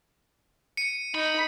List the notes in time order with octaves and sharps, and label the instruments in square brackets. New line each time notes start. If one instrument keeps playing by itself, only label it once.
[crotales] C#7 D#7
[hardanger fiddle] D#4 [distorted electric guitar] B5